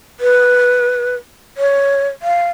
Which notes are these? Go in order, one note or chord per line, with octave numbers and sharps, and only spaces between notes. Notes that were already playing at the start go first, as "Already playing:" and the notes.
B4
C#5
F5